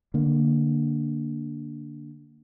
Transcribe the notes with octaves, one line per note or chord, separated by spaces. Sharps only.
D3 A#3